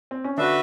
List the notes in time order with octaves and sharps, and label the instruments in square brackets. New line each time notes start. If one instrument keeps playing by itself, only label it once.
[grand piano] C4
C#4
[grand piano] D3 D4 [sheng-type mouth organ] F#4 B4 E5